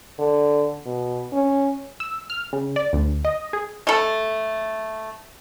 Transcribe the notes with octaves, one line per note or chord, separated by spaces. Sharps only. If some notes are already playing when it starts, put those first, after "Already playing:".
D3
B2
C#4
E6
F6
C#3
D5
D2
D#5
G#4
A3 A4